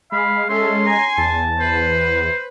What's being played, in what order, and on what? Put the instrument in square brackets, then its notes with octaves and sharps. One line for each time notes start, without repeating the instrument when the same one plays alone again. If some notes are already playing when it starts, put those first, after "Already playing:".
[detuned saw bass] G#3 [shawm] F5 [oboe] B5
[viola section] C#4 A4 [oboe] E5 [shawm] C6
[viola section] G#5 [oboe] A#5
[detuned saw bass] E2 [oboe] A5
[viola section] B4 [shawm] C5